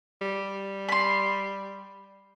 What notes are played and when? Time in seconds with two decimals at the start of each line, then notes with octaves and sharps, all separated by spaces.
0.21 G3
0.89 B5 C6